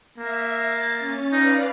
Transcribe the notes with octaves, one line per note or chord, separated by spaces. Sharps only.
A#3 E5
A6
C#4
D#4 B4 D5 F5